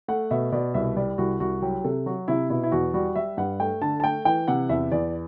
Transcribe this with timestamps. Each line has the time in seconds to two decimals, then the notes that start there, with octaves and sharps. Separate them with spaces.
0.08 A3 F#5
0.31 B2 E5
0.52 B2 D5
0.74 C2 E5
0.97 G3 D5
1.18 C2 F#4
1.40 C2 F#4
1.62 F#3 G4
1.84 C3 A4
2.06 F#3 F#4
2.28 C3 E4
2.50 B2 E4
2.64 E4
2.72 E2 F#4
2.94 G3 F#4
3.16 G3 E5
3.37 G2 F#5
3.60 A3 G5
3.82 D3 A5
4.00 A5
4.04 A3 G5
4.25 E3 G5
4.48 C3 F#5
4.69 E2 E5
4.92 E2 D5